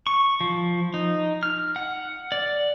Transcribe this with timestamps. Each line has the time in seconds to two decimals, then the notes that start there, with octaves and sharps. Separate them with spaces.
0.07 C#6
0.41 F3
0.94 D#4
1.43 F6
1.76 F#5
2.32 D5